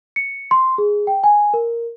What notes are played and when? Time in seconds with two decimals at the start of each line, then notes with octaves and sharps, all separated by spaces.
0.16 C#7
0.51 C6
0.78 G#4
1.07 G5
1.24 G#5
1.54 A#4